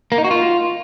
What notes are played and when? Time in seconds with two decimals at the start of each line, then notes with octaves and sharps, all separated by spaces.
0.12 A#3
0.18 D#4
0.24 F#4
0.31 F4